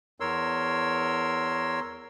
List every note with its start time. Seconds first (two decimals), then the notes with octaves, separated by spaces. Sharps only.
0.20 E2 A#4 C#5 C6 E6